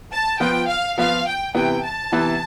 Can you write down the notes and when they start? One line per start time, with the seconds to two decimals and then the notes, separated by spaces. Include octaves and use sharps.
0.12 A5
0.40 F3 B3 F4 G5
0.69 F5
0.98 F3 B3 F4 F5
1.26 G5
1.55 C3 E3 B3 G5
1.83 A5
2.12 C3 E3 B3